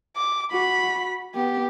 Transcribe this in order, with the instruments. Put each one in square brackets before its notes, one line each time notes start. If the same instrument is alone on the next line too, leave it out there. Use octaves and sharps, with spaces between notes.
[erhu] D6
[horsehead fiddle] F#4 [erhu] B5
[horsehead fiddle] B3 [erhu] G4